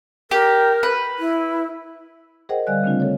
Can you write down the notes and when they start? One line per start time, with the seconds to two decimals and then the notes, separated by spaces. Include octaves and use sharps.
0.31 G4 A#4
0.83 B4
1.19 E4
2.49 G#4 A#4 C5 D#5 F#5 G5
2.67 D3 G3 D5 F5 G#5 F#6
2.84 C#3 A3 C4 D4 F4
3.00 A4 C#5